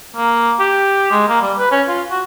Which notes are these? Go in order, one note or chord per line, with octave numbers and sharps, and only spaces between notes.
A#3
G4
G#3
A#3
G3
B4
C#4
F4
F#4